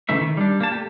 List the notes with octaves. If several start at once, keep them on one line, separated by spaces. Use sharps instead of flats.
C#3 E3 A3 D#4 E5
D#3
G3 D4
A#3 A5
A3 G4